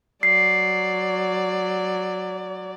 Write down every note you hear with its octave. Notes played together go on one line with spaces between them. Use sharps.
F#3 D5 C7